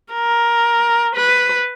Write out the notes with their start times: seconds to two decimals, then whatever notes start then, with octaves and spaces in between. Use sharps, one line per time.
0.13 A#4
1.15 B4